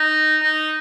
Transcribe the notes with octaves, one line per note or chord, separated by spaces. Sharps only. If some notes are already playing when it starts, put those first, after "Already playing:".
Already playing: D#4
D#4